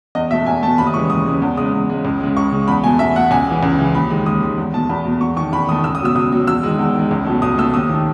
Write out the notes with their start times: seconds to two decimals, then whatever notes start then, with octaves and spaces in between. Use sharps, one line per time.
0.15 E2 D#5
0.31 B2 E5
0.33 A3
0.46 E2 G#5
0.63 B2 A3 A5
0.78 D#2 B5
0.87 D#6
0.94 C#3 E3 G#3 C#6
1.10 D#2 D#6
1.26 C#3 E3 G#3
1.42 E2
1.57 C#3 G#3 D#6
1.73 E2
1.89 C#3 G#3
2.05 C#2
2.20 C#3 G#3
2.37 C#2 C#6
2.52 C#3 G#3
2.68 E2 B5
2.84 B2 A3 G#5
2.99 E2 E5
3.15 B2 A3 F#5
3.31 C#2 G#5
3.47 C#3 E3
3.63 C#2
3.78 C#3 E3
3.95 D#2 B5
4.10 D#3 G#3
4.26 D#2 D#6
4.42 D#3 G#3
4.58 E2
4.74 B2 A3 A5
4.89 E2 B5
5.05 B2 A3
5.21 E2 C#6
5.36 D#3 C#6
5.40 A3
5.53 E2 B5
5.69 D#3 A3 D#6
5.84 C#2 E6
5.95 D#6
6.01 B2 F#3 E6
6.15 C#2 D#6
6.32 B2 F#3
6.48 E2 E6
6.63 D#3 G#3
6.79 E2
6.95 D#3 G#3
7.11 C#2
7.26 B2 F#3 A3
7.42 C#2 D#6
7.58 B2 F#3 A3 E6
7.74 D#2 D#6
7.89 D#3 A3